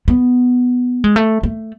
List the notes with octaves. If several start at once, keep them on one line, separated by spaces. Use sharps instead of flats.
B3
G#3
A3
A3